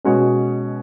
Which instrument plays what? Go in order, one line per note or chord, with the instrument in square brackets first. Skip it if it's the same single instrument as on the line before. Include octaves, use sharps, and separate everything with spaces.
[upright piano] B2 G#3 C#4 F#4 C#5